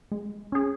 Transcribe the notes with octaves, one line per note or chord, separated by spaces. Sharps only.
G#3
C#4 G#4